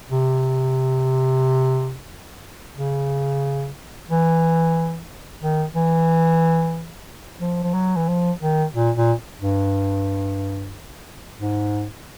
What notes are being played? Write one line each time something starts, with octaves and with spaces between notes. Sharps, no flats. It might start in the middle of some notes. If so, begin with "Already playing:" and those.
C3
C#3
E3
D#3
E3
F3
F3
F#3
E3
F3
D#3
A#2
A#2
G2
G#2